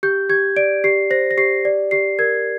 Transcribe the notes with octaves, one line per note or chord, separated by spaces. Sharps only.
G4 G6
G4 G#6
D5 D7
G4 C7
C5 A#6
A#6
G4 C7
D5
G4 C7
A#4 G#6